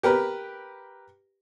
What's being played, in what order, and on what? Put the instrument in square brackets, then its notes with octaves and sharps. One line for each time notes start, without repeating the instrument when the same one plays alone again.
[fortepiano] G4 A#4 B4